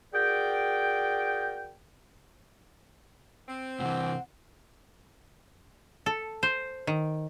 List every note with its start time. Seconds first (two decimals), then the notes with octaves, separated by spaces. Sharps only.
0.13 F#4 G#4 A#4 D5 G5
3.48 C4
3.80 A2 C3 E3 F#5
6.06 A4
6.43 C5
6.87 D#3